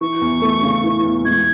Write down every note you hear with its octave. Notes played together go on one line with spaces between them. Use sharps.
E3 C#6
E2
A3
C#3
E3
E2
G#3 G#6